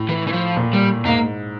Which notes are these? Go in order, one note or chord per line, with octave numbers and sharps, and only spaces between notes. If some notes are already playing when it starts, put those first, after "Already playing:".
Already playing: A2
E3
E3
F3
A#2
G3
G#2 A#3